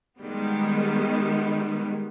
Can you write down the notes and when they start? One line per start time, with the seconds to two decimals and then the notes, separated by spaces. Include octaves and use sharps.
0.20 D#3 G3 G#3 B3